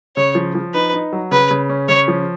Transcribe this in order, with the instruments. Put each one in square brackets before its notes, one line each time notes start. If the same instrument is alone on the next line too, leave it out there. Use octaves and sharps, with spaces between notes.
[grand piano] C#3 [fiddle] C#5
[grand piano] F3
F3
[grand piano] D#4 [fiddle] B4
[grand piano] D#4
F#3
[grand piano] C#3 [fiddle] B4
[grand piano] C#3
C#4
[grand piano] C#3 [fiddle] C#5
[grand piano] F3